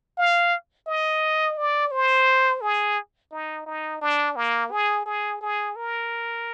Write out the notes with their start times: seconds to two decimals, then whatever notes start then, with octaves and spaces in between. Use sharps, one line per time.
0.18 F5
0.87 D#5
1.57 D5
1.91 C5
2.61 G#4
3.31 D#4
3.66 D#4
4.01 D4
4.36 A#3
4.71 G#4
5.06 G#4
5.41 G#4
5.76 A#4